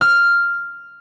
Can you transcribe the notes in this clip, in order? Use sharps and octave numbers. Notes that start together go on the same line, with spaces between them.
F6